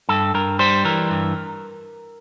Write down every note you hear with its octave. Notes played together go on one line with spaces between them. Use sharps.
G2 A4
G2 A#4
G3 C5
E3 A#4
G2